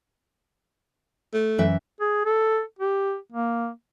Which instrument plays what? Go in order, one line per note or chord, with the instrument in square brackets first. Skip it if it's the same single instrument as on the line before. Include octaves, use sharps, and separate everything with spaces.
[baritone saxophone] A3
[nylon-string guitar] F#2 E3 E5
[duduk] G#4
A4
G4
A#3